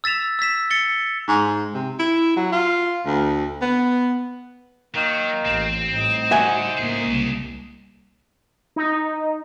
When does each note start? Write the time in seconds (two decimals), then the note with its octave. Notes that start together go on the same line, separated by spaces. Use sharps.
0.04 E6 A6 B6 E7 F7
0.39 E6 G#6 B6 E7
0.70 A6 C#7 G7
1.28 G#2
1.74 C3
1.99 E4
2.37 F#3
2.52 F4
3.06 D2
3.62 B3
4.94 D#3 F#3 A#3
5.45 A1 C4
5.92 A2 G3 D#4 C5
6.31 D3 F#4 E5 G#5
6.78 C#2 A2 A#3 G#4
7.10 C2
8.76 D#4